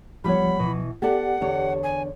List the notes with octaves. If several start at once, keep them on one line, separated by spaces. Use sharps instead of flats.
C#2 F3 G3 B3 C#5 B5
B2 E3
B3 G4 A4 D5 F#5
E2 D3 C#5
G#5